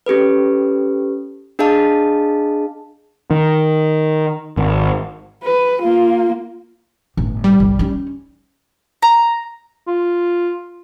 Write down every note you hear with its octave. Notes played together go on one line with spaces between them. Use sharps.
C#4 G4 A4 B4
D4 G#4 D#5 F5 A5
D#3
G#1
B4
A#3 F4
G1 A2
G3
G1 C2
C#4 D#4
A#5
F4